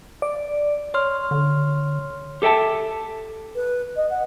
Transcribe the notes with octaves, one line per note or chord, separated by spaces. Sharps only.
D5
C#5 C6 F6
D3
G4 A4 E5 G5 A5
B4
D#5
F#5